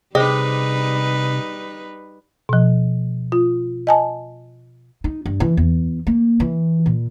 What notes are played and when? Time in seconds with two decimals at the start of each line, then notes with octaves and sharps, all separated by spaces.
0.15 C3 G3 D#4 G4 G#4 B4 C5 D#5
2.49 B2 F3
3.32 F4
3.87 D#5 G#5 A5
5.04 D#4
5.26 G2
5.40 E3
5.57 E2
6.07 A#3
6.40 E3
6.86 A#2